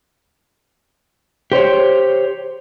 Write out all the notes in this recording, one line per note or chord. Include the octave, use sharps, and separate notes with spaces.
G4 C5 C#5